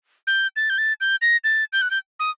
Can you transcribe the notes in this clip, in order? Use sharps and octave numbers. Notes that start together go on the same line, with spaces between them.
G6
A6
G6
A6
G6
A#6
A6
G6
F#6
G6
D#6